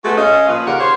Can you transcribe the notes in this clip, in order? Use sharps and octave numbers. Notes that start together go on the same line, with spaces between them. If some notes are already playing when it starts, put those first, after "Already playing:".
G#3 A3 B3 F#4
C#4 D#5 F5
A#2 F3 B4
D#2 C#3 A#4 D5 F5 F#5
C5 C#5